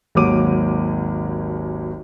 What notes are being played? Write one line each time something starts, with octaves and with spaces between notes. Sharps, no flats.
G#1 D#2 F#3 D6 D#7